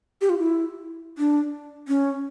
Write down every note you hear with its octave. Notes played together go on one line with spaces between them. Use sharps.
G4
F4
E4
D4
C#4